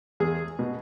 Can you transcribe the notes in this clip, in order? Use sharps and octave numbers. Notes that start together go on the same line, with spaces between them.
E2 G#4
B2